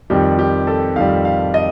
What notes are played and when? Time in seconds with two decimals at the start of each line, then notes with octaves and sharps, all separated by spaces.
0.10 F2 D#3 G3 G4
0.39 G4
0.67 A4
0.96 F2 D#3 G3 F5
1.25 F5
1.54 D#5